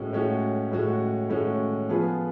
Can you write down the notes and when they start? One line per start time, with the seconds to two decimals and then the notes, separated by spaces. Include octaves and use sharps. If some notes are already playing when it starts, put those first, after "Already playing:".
Already playing: A2 G#3 C#4 F#4
0.13 A2 G#3 C#4 F#4
0.71 A2 G#3 C#4 F#4
1.29 A2 G#3 C#4 F#4
1.89 F3 B3 F4 G#4 B4